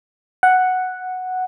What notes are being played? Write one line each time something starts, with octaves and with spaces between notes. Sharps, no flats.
F#5